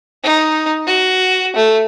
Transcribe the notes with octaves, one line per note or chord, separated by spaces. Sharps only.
D#4
F#4
A3